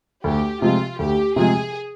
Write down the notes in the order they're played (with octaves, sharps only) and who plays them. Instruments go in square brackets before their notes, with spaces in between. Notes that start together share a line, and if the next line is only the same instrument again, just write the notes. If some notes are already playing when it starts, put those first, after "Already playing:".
[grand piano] D2 [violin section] G4
[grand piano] C3 F3 G#3 [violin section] F4
[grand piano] D2 [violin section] G4
[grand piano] C3 F3 G#3 [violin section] G#4